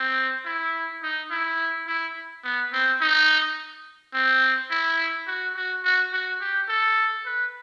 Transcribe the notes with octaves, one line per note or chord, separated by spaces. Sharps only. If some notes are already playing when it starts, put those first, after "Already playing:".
Already playing: C4
E4
D#4
E4
E4
B3
C4
D#4
C4
E4
F#4
F#4
F#4
F#4
G4
A4
B4